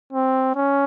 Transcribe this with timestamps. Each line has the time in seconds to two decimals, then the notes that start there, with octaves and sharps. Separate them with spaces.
0.13 C4
0.55 C#4